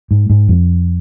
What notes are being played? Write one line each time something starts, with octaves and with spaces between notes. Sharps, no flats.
G#2
G#2
F2